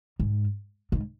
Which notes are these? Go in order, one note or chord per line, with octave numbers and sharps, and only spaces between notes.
G#2
G#2